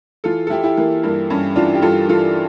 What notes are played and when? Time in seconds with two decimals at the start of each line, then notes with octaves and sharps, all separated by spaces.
0.24 E3 F4 A4
0.47 A4
0.50 E3 E4 G4
0.63 E4 G4
0.77 E3 A#3
1.04 G2 A#3
1.30 G2 C#4
1.56 E3 D4 F4
1.75 G4
1.82 G2 F4 A4
2.09 E3 F4 A4